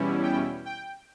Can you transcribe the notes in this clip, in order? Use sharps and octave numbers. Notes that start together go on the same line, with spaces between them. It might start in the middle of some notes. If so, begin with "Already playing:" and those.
Already playing: E2 B2 G3 C#4 E4
G5
G5